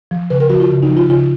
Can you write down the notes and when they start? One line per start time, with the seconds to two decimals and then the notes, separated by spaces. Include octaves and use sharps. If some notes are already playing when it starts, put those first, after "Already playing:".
0.11 F3
0.30 C#3 B4
0.40 A#4
0.50 F3 F#4
0.60 F4
0.70 C#3
0.83 D#4
0.89 F3
0.97 F4
1.09 C#3 F4